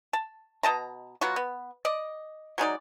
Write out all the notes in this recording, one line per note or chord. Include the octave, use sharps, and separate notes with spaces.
A5
B2 D#5 A5 A#5
F#3 B3 F4 F#4
B3
D5 D#5
F#3 G#3 D#4 D5